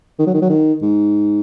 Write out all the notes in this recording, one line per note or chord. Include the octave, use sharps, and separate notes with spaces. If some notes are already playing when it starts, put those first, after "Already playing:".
D#3
F#3
D#3
F#3
D#3
G#2